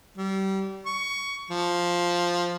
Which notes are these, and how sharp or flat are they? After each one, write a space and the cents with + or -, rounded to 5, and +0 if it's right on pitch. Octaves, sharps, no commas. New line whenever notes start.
G3 -30
C#6 +15
F3 +5